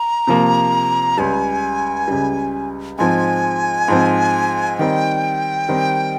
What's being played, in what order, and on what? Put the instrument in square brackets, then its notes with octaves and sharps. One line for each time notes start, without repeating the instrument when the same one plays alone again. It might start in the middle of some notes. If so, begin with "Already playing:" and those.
Already playing: [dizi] A#5
[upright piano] C3 F3 A#3
[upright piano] C#2 C#3 G3 [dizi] G#5
[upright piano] C#2 C#3 G3
[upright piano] G#2 F3 C4 [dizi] G#5
[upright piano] G#2 F3 C4
[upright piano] D#3 G3 C4 D#4 [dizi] G5
[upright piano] D#3 G3 C4 D#4